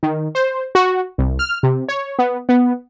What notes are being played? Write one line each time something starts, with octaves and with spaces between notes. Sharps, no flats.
D#3
C5
F#4
C2
F6
C3
C#5
B3
B3